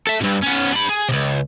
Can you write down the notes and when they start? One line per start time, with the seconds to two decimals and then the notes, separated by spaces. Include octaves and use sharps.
0.07 A4 E5
0.21 G2 B2
0.43 B3 C#4
0.73 D4 B5
0.89 G#4
1.08 C#2 C3